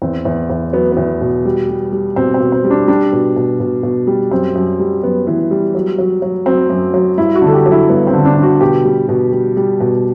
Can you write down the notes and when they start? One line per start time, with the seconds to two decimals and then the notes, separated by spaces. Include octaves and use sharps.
0.02 E2 C4
0.25 E2
0.50 E2
0.73 F#3 B3
0.92 E2 B3
1.21 B2
1.45 G3
1.69 G3
1.92 G3
2.16 B2 C4
2.34 C4
2.40 B2
2.52 C4
2.64 G3
2.70 D4
2.88 G3 D4
3.12 B2
3.36 B2
3.60 B2
3.83 B2
4.07 G3
4.31 F#2 C4
4.55 F#2
4.79 G3
5.03 F#2 B3
5.27 E3
5.51 G3
5.75 F#3
5.98 F#3
6.22 F#3
6.46 F#3 C4
6.70 F#2
6.94 F#3
7.18 G2 E4
7.35 F#4
7.42 D3
7.47 A4
7.54 G4
7.66 F#3
7.72 E4
7.89 G2 B3
8.07 C4
8.13 D3
8.25 D4
8.37 D3
8.43 F#4
8.61 B2 G4
8.85 G3
9.09 B2
9.32 G3
9.57 G3
9.80 B2